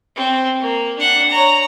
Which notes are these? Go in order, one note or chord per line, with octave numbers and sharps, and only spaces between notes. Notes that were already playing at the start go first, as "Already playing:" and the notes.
C4
A#3
D4 F#5
C#5 A#5